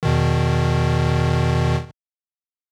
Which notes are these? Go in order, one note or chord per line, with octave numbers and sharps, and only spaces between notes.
E2 B2 D#3